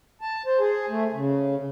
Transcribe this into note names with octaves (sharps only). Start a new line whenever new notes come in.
A5
C5
G#4
A3
C#3